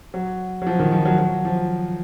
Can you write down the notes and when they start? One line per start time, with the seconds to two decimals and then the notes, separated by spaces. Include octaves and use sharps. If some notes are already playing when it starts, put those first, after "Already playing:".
0.14 F#3
0.62 F#3
0.67 F3
0.79 D#3
0.92 F3
1.05 F#3
1.18 F#3
1.45 F3